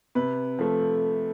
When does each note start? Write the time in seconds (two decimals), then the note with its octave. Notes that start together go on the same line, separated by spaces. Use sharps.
0.15 C3 B4
0.59 F3 A3